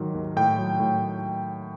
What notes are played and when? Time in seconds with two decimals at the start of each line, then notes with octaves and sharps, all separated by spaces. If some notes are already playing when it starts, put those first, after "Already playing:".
Already playing: G#2 D#3 F#3
0.15 D#2
0.36 A2 G5
0.58 F#3
0.80 A2